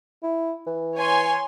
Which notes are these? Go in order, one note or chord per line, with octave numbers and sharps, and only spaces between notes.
E4
E3
C#5 G#5 C6